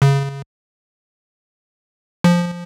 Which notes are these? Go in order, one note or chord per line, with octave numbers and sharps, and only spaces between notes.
C#3
F3